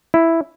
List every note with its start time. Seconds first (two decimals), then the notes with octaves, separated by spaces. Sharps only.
0.14 E4